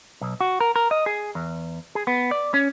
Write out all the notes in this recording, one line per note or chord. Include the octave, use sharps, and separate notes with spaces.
B1
F#4
A#4
A#4
D#5
G#4
E2
G#4
B3
D5
C#4